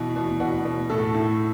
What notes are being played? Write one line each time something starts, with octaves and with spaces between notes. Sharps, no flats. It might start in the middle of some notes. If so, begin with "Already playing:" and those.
Already playing: B2 E3
B2
B2 F#5
B2
A2 A4
A2